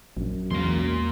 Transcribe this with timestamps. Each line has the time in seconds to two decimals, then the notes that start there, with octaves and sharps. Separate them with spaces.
0.17 A#1 F#2
0.51 E2 E3 G#3 A#3 C6